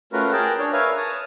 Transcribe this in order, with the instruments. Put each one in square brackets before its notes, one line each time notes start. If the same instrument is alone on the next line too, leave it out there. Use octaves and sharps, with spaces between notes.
[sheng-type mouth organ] A3 C#4 F4 F#4 A#4 B4
G#4 A#4 G5 A5
D4 C#5
A#4 B4 C#5 E5 F5 G#5
C#5 A5 D#6